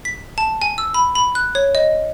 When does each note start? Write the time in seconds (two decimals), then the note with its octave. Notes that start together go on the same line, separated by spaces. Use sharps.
0.05 B6
0.38 A5
0.62 G#5
0.78 E6
0.94 B5
1.15 B5
1.35 F#6
1.55 C#5
1.75 D#5